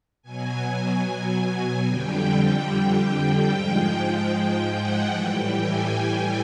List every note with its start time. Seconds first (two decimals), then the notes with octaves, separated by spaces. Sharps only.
0.22 B2 F#3 G#5
1.86 F2 D3 G3 G5
3.49 G#2 F3 G#3 G5
4.31 G5
4.73 F#5
5.13 A2 E3 G3 G5
5.54 G#5
5.96 G5